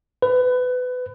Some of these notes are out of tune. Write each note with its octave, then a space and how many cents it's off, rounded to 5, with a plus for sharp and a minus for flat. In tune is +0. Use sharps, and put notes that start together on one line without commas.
B4 +25